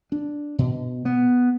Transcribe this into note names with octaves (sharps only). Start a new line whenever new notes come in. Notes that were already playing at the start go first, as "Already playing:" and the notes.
D4
B2
B3